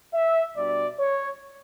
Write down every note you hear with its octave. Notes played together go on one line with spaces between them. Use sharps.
E5
B2 G3 D4 D5
C#5